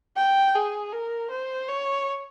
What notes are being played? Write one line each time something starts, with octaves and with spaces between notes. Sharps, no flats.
G5
G#4
A#4
C5
C#5